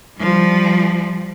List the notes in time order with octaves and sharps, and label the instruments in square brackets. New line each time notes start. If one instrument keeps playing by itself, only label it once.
[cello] F3 G3